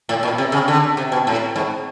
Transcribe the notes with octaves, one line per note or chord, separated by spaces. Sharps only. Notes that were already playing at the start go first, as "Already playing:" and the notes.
A2
A#2
C3
C#3
D3
C3
B2
A2
G#2